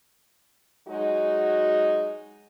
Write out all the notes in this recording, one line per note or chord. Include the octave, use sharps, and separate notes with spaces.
F#3 G#3 D#4 F#4